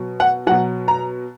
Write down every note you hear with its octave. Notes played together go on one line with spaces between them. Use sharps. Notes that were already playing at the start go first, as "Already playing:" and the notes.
Already playing: B2 F#3
F#5
B2 F#3 F#5
A#5